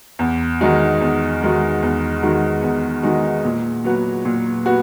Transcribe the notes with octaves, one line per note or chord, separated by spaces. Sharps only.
E2
D#3 G#3 D#4 F#4
E2
D#3 G#3 D#4 F#4
E2
D#3 G#3 D#4 F#4
E2
D#3 G#3 D#4 F#4
A#2
F#3 B3 F#4
A#2
B3 F#4